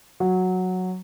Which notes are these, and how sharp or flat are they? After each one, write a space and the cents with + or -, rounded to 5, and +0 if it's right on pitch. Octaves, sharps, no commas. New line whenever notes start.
F#3 -5